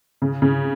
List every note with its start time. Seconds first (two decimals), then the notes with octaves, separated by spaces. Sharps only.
0.22 C#3
0.42 C#3